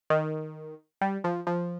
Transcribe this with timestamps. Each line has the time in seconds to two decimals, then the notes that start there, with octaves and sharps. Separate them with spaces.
0.10 D#3
1.01 G3
1.24 F3
1.47 F3